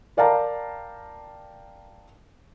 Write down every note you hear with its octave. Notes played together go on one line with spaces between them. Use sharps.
A#4 D5 F5 G5 A5 A#5